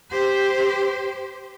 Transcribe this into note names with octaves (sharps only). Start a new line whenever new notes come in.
G4 C5